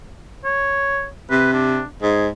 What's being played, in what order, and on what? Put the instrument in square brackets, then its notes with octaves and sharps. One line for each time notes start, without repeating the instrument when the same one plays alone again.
[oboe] C#5
[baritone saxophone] C3 [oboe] B4
[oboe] D4
[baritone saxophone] G#2 [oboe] G#4